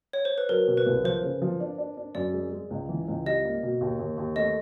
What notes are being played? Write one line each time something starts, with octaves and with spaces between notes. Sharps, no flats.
C#5
C5
B4
F#3 A#4
B2
B4
C2
F3 C5
C#3
F3
D4
D4
D4
F#2 D5
G#3
G#3
C#2
E3
C#2
G3 D#5
A#3
B2
D#2
D#2
D#2
A3 D#5